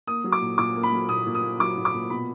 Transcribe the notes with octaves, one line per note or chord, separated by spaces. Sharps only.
A#3 D#6
F#3
D6
A#2
A#2 D6
A#3
B5
F#3
A#2 D#6
A#2
D#6
A#3
F#3 D6
A#2
D6
A#2
B2 B5